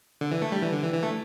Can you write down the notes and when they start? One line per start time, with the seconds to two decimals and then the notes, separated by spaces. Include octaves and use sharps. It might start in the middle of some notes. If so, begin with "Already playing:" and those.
0.21 D3
0.32 E3
0.42 A3
0.52 G3
0.62 E3
0.72 D3
0.82 E3
0.93 E3
1.03 A3